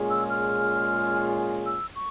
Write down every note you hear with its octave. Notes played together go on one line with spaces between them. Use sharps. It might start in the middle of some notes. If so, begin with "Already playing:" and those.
Already playing: A#2 G#3 C#4 F4 G#4
E6
F6
E6
C#6